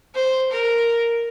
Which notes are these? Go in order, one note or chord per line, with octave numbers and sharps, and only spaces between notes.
C5
A#4